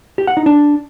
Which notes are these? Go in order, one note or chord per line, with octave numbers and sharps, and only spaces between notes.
G4
F#5
D#4
D4